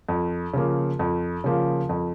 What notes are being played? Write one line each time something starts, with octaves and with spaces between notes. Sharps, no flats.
F2
C#3 F3 A#3
F2
C#3 F3 A#3
F2